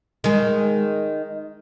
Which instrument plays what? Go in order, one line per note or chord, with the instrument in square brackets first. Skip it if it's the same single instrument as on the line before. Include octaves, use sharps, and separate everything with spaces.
[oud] D#3 G#3